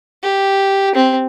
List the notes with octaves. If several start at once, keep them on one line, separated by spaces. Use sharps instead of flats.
G4
C4